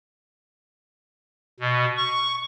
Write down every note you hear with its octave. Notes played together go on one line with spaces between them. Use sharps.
B2
C#6